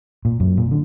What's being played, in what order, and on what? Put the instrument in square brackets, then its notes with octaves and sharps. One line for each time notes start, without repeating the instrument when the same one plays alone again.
[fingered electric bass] A#2
F#2
A#2
D3